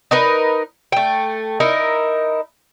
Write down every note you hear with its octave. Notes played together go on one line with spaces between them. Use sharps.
D#4 A#4 B4
A3 G5
D#4 E4 A#4